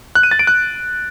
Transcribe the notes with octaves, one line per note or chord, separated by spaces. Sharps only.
F#6
D#7
A6
D7
F#6